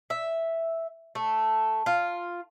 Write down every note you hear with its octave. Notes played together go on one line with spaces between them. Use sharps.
E5
A3
F4